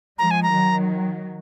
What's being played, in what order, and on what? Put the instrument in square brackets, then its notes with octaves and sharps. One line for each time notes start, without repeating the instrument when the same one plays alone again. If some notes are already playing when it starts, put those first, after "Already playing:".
[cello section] F3 G#3 [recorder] A#5
[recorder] G#5
A#5
[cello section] D#3 F#3